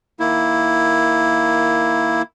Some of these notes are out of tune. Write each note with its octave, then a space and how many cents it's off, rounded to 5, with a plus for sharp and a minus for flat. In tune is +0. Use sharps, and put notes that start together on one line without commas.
D#3 +0 A#3 +0 E4 +0